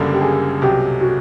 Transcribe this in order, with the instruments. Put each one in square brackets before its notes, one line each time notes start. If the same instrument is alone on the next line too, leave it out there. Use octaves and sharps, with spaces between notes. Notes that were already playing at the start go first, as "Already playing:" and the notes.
Already playing: [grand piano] F#1 F#2 D3 G3 A#3 [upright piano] A4
[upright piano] G4
G#4
[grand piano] C2 B2 F#3 [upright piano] G4
[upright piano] F#4